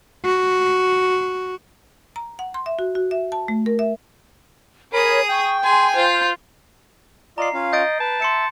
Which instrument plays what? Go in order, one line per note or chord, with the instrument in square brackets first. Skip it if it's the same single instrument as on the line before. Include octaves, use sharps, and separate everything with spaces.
[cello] F#4
[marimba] A#5
F#5
C6
E5
F#4
F#4
E5
A5
A3
A#4
E5
[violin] G#4 D#6 [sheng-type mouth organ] A#4 B5 [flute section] C#5
[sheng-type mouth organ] G5 [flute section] C#6
[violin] G#4 G#5 [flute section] C6
[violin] F4 [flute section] C5
[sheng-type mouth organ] F4 D5 D#5 [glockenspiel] A#5 C7
[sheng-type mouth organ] C#4 F4 F5
[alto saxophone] D#5 [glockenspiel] G6 A6 D7
[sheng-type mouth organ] B4 [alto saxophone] A5
[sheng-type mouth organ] E5 [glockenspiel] C6 C#7 E7